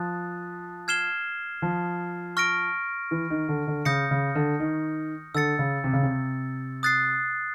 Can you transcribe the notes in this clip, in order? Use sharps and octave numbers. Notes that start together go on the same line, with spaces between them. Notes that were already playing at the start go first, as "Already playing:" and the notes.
Already playing: F3 D#6 F#6 A6
F6 G#6 C7 E7 G7
F3
C#6 F6 A#6 D7
E3
D#3
D3
D3
C#3 D#6 G6 A#6 C#7
C#3
D3
D#3
D3 E6 A6 C#7
C#3
C3
C#3
C3
D#6 F#6 A6 C7